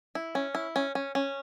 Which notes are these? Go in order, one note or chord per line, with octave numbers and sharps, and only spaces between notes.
E4
C#4
E4
C#4
C#4
C#4